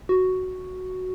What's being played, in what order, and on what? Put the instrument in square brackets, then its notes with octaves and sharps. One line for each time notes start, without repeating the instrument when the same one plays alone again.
[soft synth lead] F#4